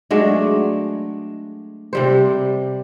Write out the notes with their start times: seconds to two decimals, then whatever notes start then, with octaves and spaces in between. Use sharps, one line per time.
0.11 F#3 G#3 A3 D4
1.93 C3 G3 C5